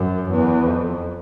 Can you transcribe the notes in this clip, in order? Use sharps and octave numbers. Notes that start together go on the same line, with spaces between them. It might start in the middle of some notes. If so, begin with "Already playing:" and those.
Already playing: F#2
E2
F2